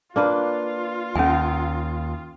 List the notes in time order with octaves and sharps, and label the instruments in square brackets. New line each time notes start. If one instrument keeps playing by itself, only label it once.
[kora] A#3 D4 B4 [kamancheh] F4
[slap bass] D#2 [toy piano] C#4 G#5